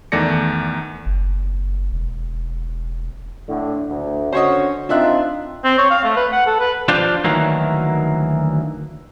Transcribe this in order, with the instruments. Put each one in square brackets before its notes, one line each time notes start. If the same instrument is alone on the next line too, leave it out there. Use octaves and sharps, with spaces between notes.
[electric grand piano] E2 D#3 A3 D5 A#6 C#7
[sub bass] F#1
E1
[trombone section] A2 D3
D2
[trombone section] D3 C#4 F#4 [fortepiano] C5 C#5 D#5
[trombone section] C4 D#4 F4 [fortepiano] D4 E5 F#6
[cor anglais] C4
C#5
F5
A3
B4
F#5
A4
B4
[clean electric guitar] F3 D4 F4 G4
D2 D#3 E3 F#3 A#3